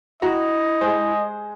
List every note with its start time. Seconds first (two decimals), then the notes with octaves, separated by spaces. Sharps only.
0.22 E4 F#4 D#5 A#5
0.81 G#3 C5